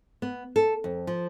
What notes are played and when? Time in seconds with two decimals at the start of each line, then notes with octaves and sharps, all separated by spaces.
0.22 B3
0.56 A4
0.84 F2
1.07 F3